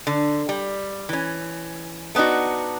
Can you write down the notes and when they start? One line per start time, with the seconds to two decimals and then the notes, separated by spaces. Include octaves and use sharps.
0.07 D3
0.49 G3
1.09 E3 C#4
2.15 A3 B3 D4 D#4 F#4